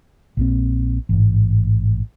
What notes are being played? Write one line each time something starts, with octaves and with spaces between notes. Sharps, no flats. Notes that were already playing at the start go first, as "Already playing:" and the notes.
A#1 A#2 C4
A1 G#2